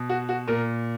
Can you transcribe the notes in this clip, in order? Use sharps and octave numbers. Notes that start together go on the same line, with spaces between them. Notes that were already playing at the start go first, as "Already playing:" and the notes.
Already playing: B2
F#4
F#4
A#2 A#4